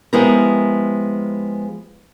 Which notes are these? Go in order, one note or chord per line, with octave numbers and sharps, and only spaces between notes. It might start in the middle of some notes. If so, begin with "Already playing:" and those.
F3 G#3 B3 E4 G4 A#4